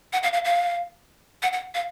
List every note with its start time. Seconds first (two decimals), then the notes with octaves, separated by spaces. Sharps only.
0.13 F#5
0.23 F5
0.33 F5
0.45 F5
1.43 F#5
1.53 F#5
1.75 F5